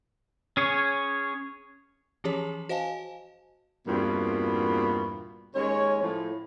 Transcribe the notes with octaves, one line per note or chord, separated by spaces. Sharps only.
C#4 G#4 C#5
E3 F3 C#4 G4 G#4 C#5
F#4 C5 D#5 F5 G#5 A5
E2 G2 A#2 B3 C4 F#4
D#2 G#3 C#4 C#5
A2 F3